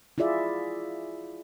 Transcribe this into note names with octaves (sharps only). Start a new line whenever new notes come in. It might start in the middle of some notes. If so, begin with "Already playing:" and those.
E4 F4 G#4 D5 E5